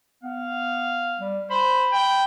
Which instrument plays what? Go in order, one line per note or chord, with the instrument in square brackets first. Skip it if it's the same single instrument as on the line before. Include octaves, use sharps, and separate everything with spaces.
[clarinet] B3 [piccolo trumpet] F5
[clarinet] G3
[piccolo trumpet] C5 [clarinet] B5
[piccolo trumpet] G5